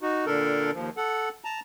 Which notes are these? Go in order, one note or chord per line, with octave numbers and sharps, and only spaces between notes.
D#4 F#4
A#2 D3 D4 A4 A#4
D#2 F3
A4 F#5
A5 A#5